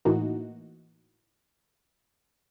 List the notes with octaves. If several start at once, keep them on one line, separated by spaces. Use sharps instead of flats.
A2 E3 A#3 D#4 F#4